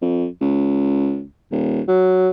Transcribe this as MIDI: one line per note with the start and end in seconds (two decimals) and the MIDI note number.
0.02 0.26 41
0.41 1.23 37
1.51 1.80 27
1.88 2.30 54